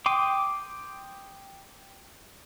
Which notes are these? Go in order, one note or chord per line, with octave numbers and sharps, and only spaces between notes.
G5 C6 D6 D#6